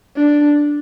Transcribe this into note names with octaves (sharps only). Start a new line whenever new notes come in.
D4